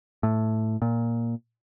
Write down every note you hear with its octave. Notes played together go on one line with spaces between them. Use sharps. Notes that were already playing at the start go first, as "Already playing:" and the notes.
A2
A#2